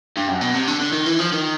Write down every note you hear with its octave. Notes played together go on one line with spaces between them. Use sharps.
G2
F#2
B2
C3
D3
D3
D#3
E3
F3
D#3